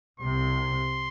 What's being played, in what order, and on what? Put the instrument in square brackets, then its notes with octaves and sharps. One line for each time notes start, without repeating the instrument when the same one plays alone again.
[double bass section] C2 C3 [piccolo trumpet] C6